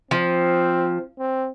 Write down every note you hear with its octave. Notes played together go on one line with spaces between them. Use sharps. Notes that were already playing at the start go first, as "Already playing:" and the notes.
F3 C4
C4